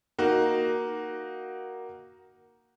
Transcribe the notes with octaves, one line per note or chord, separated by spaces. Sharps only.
A#3 D#4 F#4